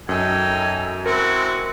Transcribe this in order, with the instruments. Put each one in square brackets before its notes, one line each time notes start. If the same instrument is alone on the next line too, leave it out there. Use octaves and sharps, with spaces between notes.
[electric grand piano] F#2 [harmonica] D#4 A4 G5 [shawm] G#5
[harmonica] G#3 C4 E4 [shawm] F#4 [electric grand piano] A#4